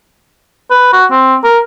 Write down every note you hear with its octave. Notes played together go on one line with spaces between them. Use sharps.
B4
F#4
C4
A#4